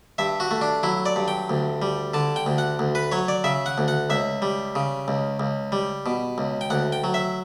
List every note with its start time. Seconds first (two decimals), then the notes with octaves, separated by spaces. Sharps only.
0.18 G2 E5
0.40 F#4
0.51 A3
0.61 D4
0.83 F#3 E4
1.06 D5
1.16 G2
1.28 G5
1.50 D2
1.82 G3
2.14 D3 A5
2.36 G5
2.46 D2
2.58 F#5
2.79 D2
2.95 B4
3.12 F#3 C#5
3.28 D5
3.44 C#3 E5
3.66 F#5
3.78 D2
3.88 F#5
4.10 C#2 E5
4.42 G3
4.75 C#3
5.08 C#2
5.40 C#2
5.72 G3
6.06 B2
6.38 C#2
6.61 G5
6.70 D2 F#5
6.92 G5
7.04 F#3
7.14 E5